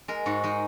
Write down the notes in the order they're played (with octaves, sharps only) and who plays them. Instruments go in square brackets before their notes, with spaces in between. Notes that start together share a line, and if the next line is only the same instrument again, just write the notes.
[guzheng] G#3 A#4
G#2 F#4
G#3 D#4